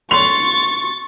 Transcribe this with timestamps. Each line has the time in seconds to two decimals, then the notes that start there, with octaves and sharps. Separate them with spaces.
0.11 C6 C#6 A6 F7